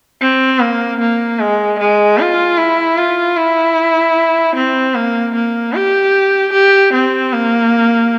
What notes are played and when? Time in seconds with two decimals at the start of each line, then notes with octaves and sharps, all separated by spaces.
0.21 C4
0.60 A#3
1.00 A#3
1.39 G#3
1.79 G#3
2.19 F4
2.57 E4
2.97 F4
3.37 E4
4.55 C4
4.95 A#3
5.35 A#3
5.74 G4
6.52 G4
6.93 C4
7.33 A#3